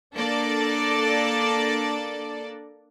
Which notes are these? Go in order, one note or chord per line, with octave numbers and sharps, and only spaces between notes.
A#3 D4 A4 D5